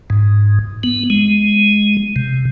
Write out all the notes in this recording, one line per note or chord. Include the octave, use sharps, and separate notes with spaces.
G#2
B3
G#3
C3